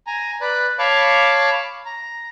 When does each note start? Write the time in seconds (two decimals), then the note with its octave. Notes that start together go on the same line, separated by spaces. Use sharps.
0.07 G#5 A#5
0.41 B4 D5 B5 F#6
0.79 C#5 F5 A5 B5 C#6 D6
1.86 A#5